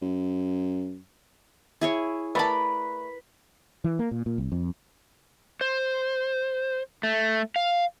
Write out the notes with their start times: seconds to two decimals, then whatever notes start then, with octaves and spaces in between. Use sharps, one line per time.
0.02 F#2
1.81 E4 G#4 C#5
2.35 A3 A#4 B4 D5 A5 B5
3.84 E3
3.99 A#3
4.11 A#2
4.26 A#2
4.38 C2
4.52 F2
5.61 C5
7.03 A3
7.56 F5